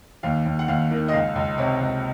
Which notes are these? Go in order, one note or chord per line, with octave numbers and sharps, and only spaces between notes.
D#2 F5
D#2
F#5
D#2 F5
D#3
D#5
C#2 F5
C#2
C3 C#5
C#2